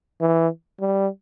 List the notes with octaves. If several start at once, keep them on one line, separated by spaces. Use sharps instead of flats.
E3
G3